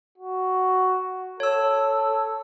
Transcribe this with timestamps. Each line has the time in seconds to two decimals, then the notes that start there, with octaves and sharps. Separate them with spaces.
0.18 F#4
1.40 A4 C#5 E6